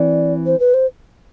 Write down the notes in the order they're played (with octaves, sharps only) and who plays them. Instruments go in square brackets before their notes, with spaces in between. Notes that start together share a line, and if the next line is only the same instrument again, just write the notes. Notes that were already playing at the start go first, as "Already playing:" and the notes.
Already playing: [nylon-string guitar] E3 C4 [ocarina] D5
[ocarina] C5
B4
C5